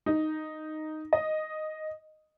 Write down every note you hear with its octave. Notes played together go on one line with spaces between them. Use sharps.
D#4
D#5